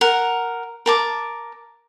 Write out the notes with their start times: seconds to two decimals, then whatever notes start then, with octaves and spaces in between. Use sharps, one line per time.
0.01 A#4 F#5
0.86 A#4 A5 D6